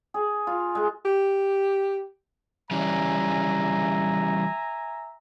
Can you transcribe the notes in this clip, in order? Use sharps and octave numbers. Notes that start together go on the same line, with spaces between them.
G#4
F4
G#3
G4
E3 G3 C#4 E5 G#5 A#5